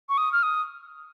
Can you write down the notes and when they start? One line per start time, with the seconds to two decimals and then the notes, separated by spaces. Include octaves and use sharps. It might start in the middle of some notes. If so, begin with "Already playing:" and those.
0.09 C#6
0.18 D#6
0.32 F6
0.43 D#6